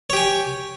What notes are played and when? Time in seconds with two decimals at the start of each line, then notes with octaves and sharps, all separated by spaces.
0.10 C#5
0.13 G4
0.17 G#5